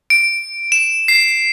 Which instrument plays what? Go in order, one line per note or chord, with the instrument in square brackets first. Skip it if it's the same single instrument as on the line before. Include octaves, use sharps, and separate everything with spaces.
[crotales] D7
E7
C7